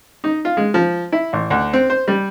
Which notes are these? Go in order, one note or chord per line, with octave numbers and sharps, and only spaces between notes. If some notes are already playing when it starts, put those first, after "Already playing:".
D#4
F4
G#3
F3
E4
A1
D2
C4
C5
G3